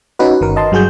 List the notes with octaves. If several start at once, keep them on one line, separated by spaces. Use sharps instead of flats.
C#4 D#4 F#4 B4
G1 D#3 A#4
D#5 A5 C6
G2 F#3 F#4 G#4 G6